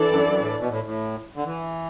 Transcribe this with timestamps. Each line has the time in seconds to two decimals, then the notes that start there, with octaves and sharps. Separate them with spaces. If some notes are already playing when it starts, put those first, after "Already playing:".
Already playing: E3 D4 A4 D5
0.09 F#2
0.24 F#2
0.39 A2
0.59 B2
0.69 A2
0.84 A2
1.35 D3
1.45 E3